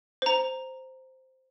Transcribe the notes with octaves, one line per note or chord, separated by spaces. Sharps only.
C5 A#5